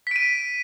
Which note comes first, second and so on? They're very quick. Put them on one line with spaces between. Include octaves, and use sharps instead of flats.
B6 D7 D#7